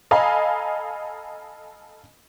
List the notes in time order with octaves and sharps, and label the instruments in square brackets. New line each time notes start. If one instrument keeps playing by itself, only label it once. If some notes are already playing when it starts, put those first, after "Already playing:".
[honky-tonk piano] A4 D#5 F5 G#5 A#5 B5